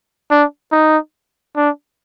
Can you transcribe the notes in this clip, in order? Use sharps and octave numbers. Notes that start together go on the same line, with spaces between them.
D4
D#4
D4